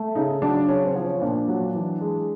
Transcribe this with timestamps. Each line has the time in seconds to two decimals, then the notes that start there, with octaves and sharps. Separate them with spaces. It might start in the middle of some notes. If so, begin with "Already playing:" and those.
Already playing: A3
0.15 C#3 D#4
0.42 F#3 D4
0.69 C#3 C#4
0.86 C4
0.96 F3
1.04 C#4
1.21 A#2 D4
1.48 F#3
1.74 E3
2.01 G#3